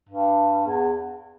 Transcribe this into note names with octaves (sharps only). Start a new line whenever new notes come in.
G2
E2